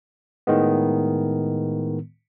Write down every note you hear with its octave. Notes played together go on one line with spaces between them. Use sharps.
A2 D#3 G#3 B3